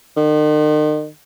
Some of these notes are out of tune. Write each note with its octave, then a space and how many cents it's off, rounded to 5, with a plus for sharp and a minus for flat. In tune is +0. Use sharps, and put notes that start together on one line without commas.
D#3 -40